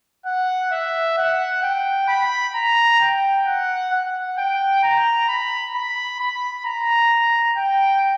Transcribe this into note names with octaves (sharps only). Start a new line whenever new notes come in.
F#5
E5
F#5
G5
B5
A#5
G5
F#5
F#5
G5
A#5
B5
B5
B5
A#5
G5